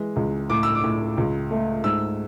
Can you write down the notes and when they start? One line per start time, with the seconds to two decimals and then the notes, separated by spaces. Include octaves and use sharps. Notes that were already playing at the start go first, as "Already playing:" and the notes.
Already playing: E3 G#3
0.16 C#2
0.50 A2 D6
0.63 E6
0.75 D6
0.84 A2
1.17 C#2
1.51 A3
1.84 G#2 E6